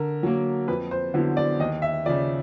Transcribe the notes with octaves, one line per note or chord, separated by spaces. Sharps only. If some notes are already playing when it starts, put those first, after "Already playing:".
Already playing: D3 A#4
F#3 A#3
F2 B4
C5
D3 F#3 B3 E4
D5
D#2 D#5
E5
C#3 F3 D5